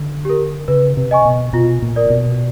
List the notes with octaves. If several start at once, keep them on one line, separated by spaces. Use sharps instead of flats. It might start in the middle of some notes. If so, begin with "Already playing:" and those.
Already playing: D3
G4 A#4
C#3 B4
C3
D#5 G#5 C#6
B2
B2 F4
A#2
A#4 D5
B2